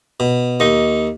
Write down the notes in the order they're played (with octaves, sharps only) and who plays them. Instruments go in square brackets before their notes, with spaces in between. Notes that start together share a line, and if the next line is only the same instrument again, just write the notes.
[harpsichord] B2
[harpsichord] D#2 [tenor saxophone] D#4